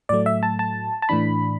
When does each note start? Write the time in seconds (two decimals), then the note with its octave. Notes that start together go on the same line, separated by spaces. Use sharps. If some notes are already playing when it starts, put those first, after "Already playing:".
0.09 A2 F#3 A3 D5
0.26 E5
0.43 A5
0.59 A5
1.02 A5
1.09 A2 E3 D4 B5